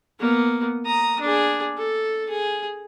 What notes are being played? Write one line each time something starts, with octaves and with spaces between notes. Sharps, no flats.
A#3 B3
A#5 D#6
D4 G#4
A4
G#4